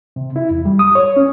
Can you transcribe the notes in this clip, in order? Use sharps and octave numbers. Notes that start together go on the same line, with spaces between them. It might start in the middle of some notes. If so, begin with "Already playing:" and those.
C3
E4
E2
G3
D#6
C#5
C#4